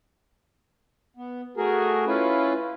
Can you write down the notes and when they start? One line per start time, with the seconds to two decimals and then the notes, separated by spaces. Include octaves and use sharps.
1.17 B3
1.57 A3 F#4 G#4 A#4
2.07 C#4 E4 F4 B4